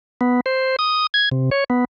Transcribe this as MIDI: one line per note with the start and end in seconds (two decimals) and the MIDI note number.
0.21 0.40 59
0.46 0.76 72
0.79 1.07 87
1.14 1.29 92
1.32 1.50 48
1.51 1.64 73
1.70 1.85 59